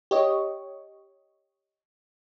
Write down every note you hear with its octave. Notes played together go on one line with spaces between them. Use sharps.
G4 C#5 D#5